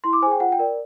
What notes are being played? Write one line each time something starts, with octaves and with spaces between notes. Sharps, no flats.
E4 C6
D6
G#4 C5 G#5
G5
F4 F#5
G5
A#4 D5